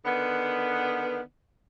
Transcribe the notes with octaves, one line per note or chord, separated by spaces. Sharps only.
D3 D#3 B3